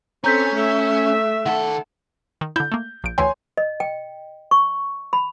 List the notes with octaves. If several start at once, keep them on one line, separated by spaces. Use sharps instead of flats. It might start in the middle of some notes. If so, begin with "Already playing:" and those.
C4 C#4 A4 A#5 G6 B6
A3 E5
D#3 A4 F#5
D#3
D3 E4 G6
A3 A#3
A#1 D7
D2 E3 C#5 G5 G#5 C6
D#5
G5
C#6
B5